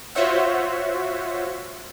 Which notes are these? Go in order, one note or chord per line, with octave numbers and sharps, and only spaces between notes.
F4 F#4 C5 C#5 E5 F#5